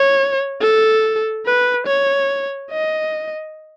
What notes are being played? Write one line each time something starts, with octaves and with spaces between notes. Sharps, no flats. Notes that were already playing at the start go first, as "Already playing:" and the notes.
Already playing: C#5
A4
B4
C#5
D#5